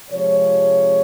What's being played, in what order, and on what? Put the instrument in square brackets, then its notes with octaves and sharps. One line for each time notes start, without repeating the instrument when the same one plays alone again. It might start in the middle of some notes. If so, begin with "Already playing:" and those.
[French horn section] C3 F3 G#3 C#5